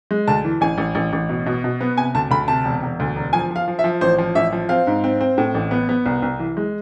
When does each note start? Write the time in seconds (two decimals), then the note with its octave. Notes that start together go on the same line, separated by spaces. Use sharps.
0.11 G#3
0.28 D2 A5
0.45 E3
0.61 A1 G#5
0.78 A1
0.95 A1
1.13 A1
1.29 B2
1.46 B2
1.64 B2
1.81 B3
1.97 C3 G#5
2.15 D2 A5
2.31 D2 B5
2.48 C3 A5
2.65 E1
2.83 E1
3.00 D2
3.16 E1
3.33 F3 G#5
3.51 F3 F5
3.68 F3
3.79 E5
3.84 F3
4.01 A1 C5
4.18 F3
4.35 A1 E5
4.53 F3
4.69 C4 F5
4.87 G#2
5.04 C4
5.21 C4
5.38 A2
5.54 A1
5.71 B3
5.89 B3
6.06 C2
6.22 C2
6.40 E3
6.57 G#3